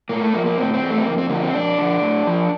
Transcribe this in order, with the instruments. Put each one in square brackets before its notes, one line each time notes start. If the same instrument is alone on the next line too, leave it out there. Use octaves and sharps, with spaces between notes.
[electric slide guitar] A2 A#3
A3
F3 A#3
A#3
A2 C4
C4
E3
A3
C4
F2 A#3
C4
D3 F3 A#3
C4
F2 D4
D3 F3
A2
F3